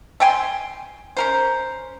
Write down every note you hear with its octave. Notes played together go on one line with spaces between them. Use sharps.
A3 G5 G#5 C6
C#4 A#4 C5